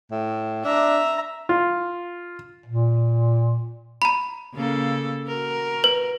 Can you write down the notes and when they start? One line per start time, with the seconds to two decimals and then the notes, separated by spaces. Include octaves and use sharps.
0.11 A2
0.65 D4 E5 A#5
1.49 F4
2.66 A#2
4.02 A#5 B5
4.54 C#3 A#3 A4
5.27 F#4 A#4
5.84 B4